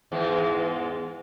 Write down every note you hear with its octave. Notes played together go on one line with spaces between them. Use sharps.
E2 G#2 G#3